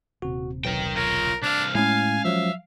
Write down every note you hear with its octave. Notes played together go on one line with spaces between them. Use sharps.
D#1 C3 F#4
B1 A#4 G5
F4 A#4 C#5
C2 D4 F5
A2 G#3 C#4 F5 G#5
F3 F#3 E5